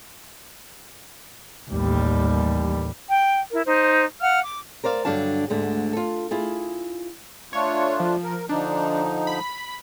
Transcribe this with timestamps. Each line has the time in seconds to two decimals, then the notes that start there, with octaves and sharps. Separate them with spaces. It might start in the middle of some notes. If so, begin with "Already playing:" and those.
1.69 A1 D#2 G3
3.09 G5
3.51 E4 A#4
3.65 D#4 C5
4.21 F5 F#5 F6
4.43 D6
4.84 A#4 C5 D5 F5
5.05 G2 D3 F#3 D4 F5 A5
5.50 D2 G#2 D3
5.93 F4 A4
6.31 E4 F4 G#4
7.53 A3 D4 F4 C#5
8.00 F3
8.24 A#4
8.49 D3 F3 D4 D#4
9.27 B5